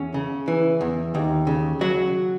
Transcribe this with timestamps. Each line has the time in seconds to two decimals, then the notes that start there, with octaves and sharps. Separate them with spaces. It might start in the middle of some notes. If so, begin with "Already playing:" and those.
Already playing: E2 C#4
0.14 C#3
0.48 E3
0.81 E2
1.15 D#2
1.47 C#3
1.81 F#3 F#4